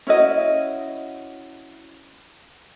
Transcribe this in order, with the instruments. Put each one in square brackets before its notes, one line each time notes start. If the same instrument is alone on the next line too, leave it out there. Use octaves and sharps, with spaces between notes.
[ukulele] C#4 E4 F#4 D#5